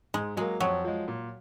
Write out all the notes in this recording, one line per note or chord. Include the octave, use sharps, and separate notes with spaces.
G#2 G#3
F#3 G#3 A#3
F2 F#3
F3 G#3
A#2